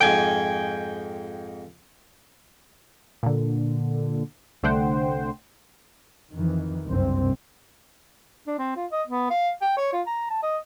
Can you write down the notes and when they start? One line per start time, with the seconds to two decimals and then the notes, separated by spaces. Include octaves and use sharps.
0.01 F2 G#2 G5 G#5
3.23 A#2 D3
4.63 C2 D3 A3 C5 F#5 G5
6.32 F2 D#3 E3
6.86 F#1 C2 G2 C3 C4
8.47 D4
8.58 C4
8.77 F4
8.92 D#5
9.07 B3
9.31 F5
9.62 G5
9.77 C#5
9.93 F4
10.07 A#5
10.30 A5
10.43 D#5